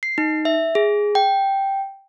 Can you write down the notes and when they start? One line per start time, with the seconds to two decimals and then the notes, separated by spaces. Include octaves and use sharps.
0.03 C7
0.18 D#4
0.45 E5
0.75 G#4
1.15 G5